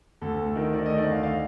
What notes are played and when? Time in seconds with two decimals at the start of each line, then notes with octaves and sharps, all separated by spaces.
0.21 D2 A4
0.39 A3
0.56 D#3 A#4
0.73 D#3 D5
0.86 D#5
0.90 A3
0.98 D5
1.06 D2 F5
1.23 F5